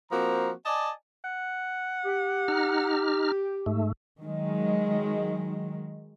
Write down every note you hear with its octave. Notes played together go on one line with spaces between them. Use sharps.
F3 A#3 C4 F#4 A#5
D5 D#5 G#5 A5
F#5
G4
D#4 F6
G#2 A3
D#3 F#3 G#3